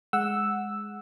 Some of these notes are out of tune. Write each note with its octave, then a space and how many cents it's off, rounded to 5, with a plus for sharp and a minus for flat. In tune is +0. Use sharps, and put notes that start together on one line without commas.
G#3 +0 F#5 -5 E6 +0